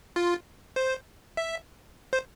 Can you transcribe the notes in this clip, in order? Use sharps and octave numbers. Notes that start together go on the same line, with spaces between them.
F4
C5
E5
C5